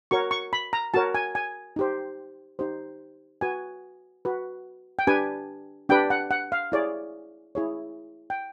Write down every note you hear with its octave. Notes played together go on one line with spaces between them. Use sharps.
F#4 A#4 C#5 C#6
C#6
B5
A#5
F#4 A#4 C#5 A5
G#5
G#5
D#4 G4 C5
D#4 G4 C5
F#4 B4 G#5
F#4 B4
G5
D4 G4 B4 G#5
D4 G4 B4 G5
F#5
F#5
F5
E4 G#4 C#5 D5
E4 G#4 C#5
G5